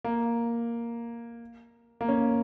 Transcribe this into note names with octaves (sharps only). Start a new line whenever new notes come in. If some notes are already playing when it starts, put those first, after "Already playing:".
A#3
A#3
C#4